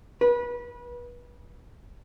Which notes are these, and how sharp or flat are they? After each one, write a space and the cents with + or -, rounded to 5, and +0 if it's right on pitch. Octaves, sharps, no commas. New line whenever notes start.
B4 -30